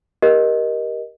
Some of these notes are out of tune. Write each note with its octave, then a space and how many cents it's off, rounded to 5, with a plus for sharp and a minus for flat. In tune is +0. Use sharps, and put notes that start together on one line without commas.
G4 +0 A#4 +20 D#5 +0